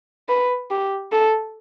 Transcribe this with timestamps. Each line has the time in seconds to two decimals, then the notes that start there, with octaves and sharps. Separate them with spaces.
0.29 B4
0.71 G4
1.12 A4